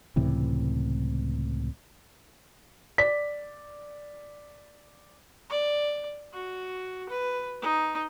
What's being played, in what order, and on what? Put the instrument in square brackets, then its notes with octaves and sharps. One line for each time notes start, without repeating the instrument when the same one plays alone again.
[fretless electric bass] C#2 A2 C3 E3
[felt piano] D5 B6
[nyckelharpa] D5
F#4
B4
D#4